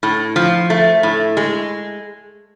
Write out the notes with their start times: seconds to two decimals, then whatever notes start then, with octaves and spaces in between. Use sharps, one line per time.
0.03 A2
0.36 F3
0.70 A3
1.03 A2
1.37 G#3